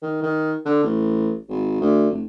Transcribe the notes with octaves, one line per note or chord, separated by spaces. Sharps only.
D#3
D#3
D3
A1
G#1
D2
F1